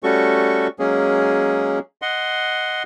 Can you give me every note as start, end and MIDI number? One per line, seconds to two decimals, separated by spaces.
0.03 0.68 55
0.03 0.68 57
0.03 0.68 61
0.03 0.68 66
0.03 0.68 69
0.03 0.68 85
0.79 1.79 54
0.79 1.79 56
0.79 1.79 58
0.79 1.79 61
0.79 1.79 68
2.02 2.83 75
2.02 2.83 78
2.02 2.83 84